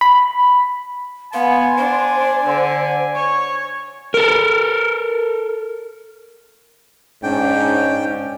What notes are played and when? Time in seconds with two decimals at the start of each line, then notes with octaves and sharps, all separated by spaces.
0.01 B5
1.33 B3 F5 G#5 C6
1.77 D4 C5
2.46 D3
3.15 C#5 C#6
4.14 A4 A#4
7.23 G#2 C#4 D4 G5